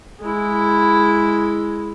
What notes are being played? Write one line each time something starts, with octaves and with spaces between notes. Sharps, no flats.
G#3 E4